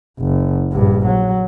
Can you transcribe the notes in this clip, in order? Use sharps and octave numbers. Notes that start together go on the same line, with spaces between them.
F#1
A#1 G2
F#3